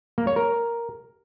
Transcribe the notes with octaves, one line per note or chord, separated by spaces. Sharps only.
A#3
C#5
A#4